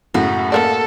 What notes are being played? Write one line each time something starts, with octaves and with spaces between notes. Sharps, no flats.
F#2 A2 C#3 F#4
A#3 A4 A#4 D5